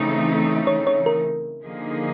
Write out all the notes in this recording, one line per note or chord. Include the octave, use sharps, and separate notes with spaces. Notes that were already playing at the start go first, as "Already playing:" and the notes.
Already playing: C#3 E3 A3 C4 D#4
C#5
C#5
A#4
D3 F3 A#3 D#4 G#4